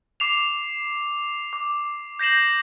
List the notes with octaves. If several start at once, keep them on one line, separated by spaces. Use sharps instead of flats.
D6 C7 E7 F7
D6
G6 A#6 C7 E7 F#7